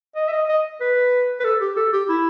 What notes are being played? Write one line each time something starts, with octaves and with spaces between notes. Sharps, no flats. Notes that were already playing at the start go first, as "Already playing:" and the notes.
D#5
E5
D#5
D#5
B4
B4
A4
G4
A4
G4
E4